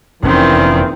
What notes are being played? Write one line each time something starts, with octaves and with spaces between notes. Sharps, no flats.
F1 E2 A#2 D#3 E3 C4 C#4